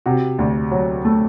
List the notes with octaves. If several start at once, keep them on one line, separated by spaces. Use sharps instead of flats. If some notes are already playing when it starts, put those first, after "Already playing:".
C3 F#4
D2
F#3
A3